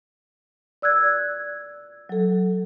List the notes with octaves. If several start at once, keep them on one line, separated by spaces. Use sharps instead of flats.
D5 E6 F#6 G#6
F#3 A4